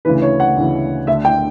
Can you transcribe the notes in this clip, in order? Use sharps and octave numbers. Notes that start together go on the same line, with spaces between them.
D2 C#3 E3 B4
C#5
F#5
D2 C#3 E3
D2 D3 E5
G5